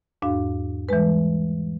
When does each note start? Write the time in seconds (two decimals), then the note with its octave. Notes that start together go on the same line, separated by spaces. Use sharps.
0.22 E2 G#2 D4 F#4 F5
0.89 E3 G3 G#3 B4